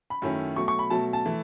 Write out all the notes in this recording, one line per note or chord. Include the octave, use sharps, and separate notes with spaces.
B5
F#2 D#3 A3 C#4 E4
B2 F#3 A3 C#6
C#6
B5
B2 F#3 A3 A5
A5
E3 A3